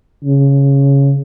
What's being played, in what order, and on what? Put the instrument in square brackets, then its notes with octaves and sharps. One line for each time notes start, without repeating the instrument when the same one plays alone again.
[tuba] C#3